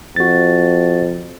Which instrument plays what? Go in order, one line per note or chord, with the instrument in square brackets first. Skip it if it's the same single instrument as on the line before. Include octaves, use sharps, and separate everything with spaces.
[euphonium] F2 [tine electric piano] F#4 A6